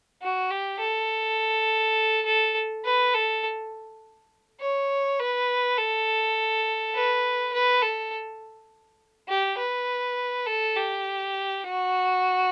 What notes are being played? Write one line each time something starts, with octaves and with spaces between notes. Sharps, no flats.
F#4
G4
A4
A4
B4
A4
C#5
B4
A4
B4
B4
A4
G4
B4
A4
G4
F#4